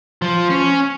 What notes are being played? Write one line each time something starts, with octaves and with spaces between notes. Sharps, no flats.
F3
C#4